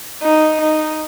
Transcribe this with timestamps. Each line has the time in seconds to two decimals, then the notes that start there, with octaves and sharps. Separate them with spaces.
0.23 D#4
0.61 D#4